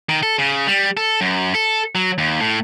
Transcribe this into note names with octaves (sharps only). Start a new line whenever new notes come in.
D#3
A4
C#3
G3
A4
F#2
A4
F#3
D#2
A2